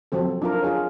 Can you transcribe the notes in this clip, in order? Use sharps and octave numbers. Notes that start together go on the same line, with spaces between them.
F3 F#3 C4 A4
D4 F4 A#4
F4 G#4 C#5